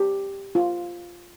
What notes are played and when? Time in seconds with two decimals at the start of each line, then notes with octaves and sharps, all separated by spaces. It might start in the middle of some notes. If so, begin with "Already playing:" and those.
Already playing: G4
0.55 F4